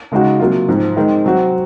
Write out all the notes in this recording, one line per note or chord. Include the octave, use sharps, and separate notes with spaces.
C#3 G#3 D#4 F#4
C3 F#3 A#3 F4
G#2 F3 C4
D#3 G#3 C4 D#4
C3 F#3 C4 F#4